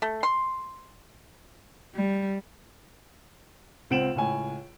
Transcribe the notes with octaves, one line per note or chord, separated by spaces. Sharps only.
A3
C6
G3
C#2 C4 F#5 D7 E7 F#7
C#2 A2 G#5